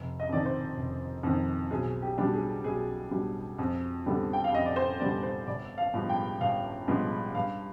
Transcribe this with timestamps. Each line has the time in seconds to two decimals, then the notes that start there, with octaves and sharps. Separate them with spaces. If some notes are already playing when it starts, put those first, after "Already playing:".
Already playing: F1
0.20 D#5
0.29 F2 D#3 D5
0.45 C5
0.77 F1
1.23 F2 D#3
1.71 B1 G#4
2.02 G4
2.18 B2 G3 D4
2.34 G#4
2.64 B1 G#4
3.11 B2 G3 D4
3.58 F2
4.06 D3 G3 B3 D4
4.33 G5
4.44 F5
4.53 F2 D#5
4.65 D5
4.76 C5
4.99 D3 G3 B3 D4 D5
5.23 C5
5.47 G1 D5
5.78 F5
5.94 G2 F3 G#3 B3
6.09 G5
6.41 G1 F5
6.88 G2 F3 G#3 B3
7.35 G2 F5